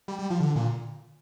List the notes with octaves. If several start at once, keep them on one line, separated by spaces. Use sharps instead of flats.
G3
G3
F3
D3
A#2